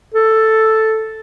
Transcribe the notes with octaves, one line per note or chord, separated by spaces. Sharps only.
A4